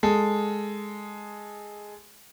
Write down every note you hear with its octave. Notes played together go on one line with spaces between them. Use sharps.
G#3 A4